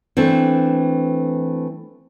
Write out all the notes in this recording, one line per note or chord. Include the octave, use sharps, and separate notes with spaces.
E3 A3 C4 D4